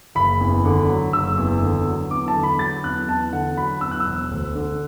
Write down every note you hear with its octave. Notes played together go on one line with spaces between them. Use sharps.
F#1 B5
E2
D3
F#3
F#1 E6
E2
D3
F#3
E2 D6
A5
D3
B5
F#3 A6
E2 F#6
E2 A5
D3 F#5
F#3 B5
E2 E6
F#6
E6
E1
D2
D3